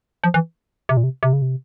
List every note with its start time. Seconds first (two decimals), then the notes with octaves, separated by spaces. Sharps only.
0.24 F3
0.34 E3
0.89 C3
0.97 A#2
1.03 C3
1.23 C3
1.33 C#3
1.42 C3